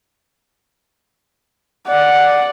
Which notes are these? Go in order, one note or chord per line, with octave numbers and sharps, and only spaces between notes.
D5 F#5